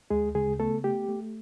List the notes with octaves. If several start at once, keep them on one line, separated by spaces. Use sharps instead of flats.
D2 G#3 G#4
C#3 G#3 G#4
A3 B3 A4
A3 G4
A3